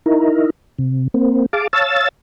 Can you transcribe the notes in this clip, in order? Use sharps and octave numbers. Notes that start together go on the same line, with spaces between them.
D#4 E4 A#4
C3
A#3 C4
G#4 F5 A5 D6
C#5 F5 A5 E6 A6